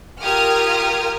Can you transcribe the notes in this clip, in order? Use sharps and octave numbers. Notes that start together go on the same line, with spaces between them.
F4 G4 A#4 D#6 F6 G#6